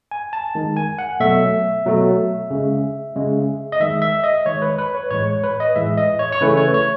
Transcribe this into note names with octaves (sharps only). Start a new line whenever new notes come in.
G#5
A5
D#3 G#3
G#5
F#5
B2 F#3 A3 E5
B2 F#3 A3
C#3 G#3
C#3 G#3
D#5
D#3 G#3 E5
E5
D#5
D#3 G#3 C#5
B4
B4
C#5
A2 E3 G#3 C#5
C#5
B4
D#5
A2 E3 G#3 E5
D#5
C#5
C#5
C#3 E3 A3 B4
C#5
C#5